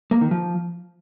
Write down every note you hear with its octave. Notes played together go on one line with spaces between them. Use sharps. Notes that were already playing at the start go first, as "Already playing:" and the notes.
A#3
D#3
F3